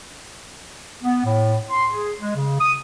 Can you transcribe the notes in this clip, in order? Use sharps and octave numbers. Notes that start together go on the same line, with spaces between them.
B3
A2
C6
G#4
G#3
C#3
D#6